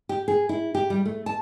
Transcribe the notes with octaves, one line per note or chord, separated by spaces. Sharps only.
G4
G#4
E4
G4
G3
A3
A5